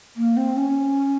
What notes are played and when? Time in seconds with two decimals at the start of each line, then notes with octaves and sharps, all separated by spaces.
0.16 A#3
0.36 C4
0.56 C#4